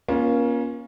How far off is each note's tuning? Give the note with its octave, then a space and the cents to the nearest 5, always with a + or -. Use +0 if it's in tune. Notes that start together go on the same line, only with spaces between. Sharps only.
A#3 +35 C#4 +0 F4 +0